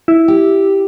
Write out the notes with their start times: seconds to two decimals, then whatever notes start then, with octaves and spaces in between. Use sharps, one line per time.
0.08 E4
0.28 G4